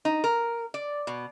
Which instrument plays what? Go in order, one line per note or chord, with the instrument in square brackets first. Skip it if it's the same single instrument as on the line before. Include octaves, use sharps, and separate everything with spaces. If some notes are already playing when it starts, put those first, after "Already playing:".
[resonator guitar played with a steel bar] D#4
A#4
D5
B2